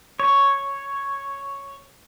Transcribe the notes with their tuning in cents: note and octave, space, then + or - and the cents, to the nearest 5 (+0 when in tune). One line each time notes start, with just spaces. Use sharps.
C#5 +0